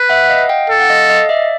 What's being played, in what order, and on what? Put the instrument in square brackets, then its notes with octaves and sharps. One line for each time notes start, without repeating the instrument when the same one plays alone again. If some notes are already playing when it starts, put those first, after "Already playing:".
Already playing: [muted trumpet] B4
[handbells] E5 F#5
F#5
D#5 F5
F5 G5
[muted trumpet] A4
[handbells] F#5
D#5 F5
D#5 F5
D5 E5